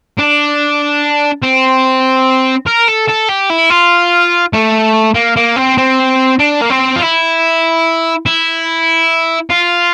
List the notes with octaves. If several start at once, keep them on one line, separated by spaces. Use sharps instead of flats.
D4
C4
A#4
A4
A4
G4
E4
F4
A3
A#3
A#3
C4
C4
D4
A#3
C4
F4
E4
E4
F4